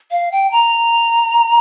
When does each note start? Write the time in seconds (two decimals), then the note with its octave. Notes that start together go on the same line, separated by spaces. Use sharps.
0.11 F5
0.32 G5
0.51 A#5